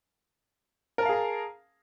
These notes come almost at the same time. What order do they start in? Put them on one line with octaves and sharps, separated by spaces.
A#4 A5 F5 G#4 A#5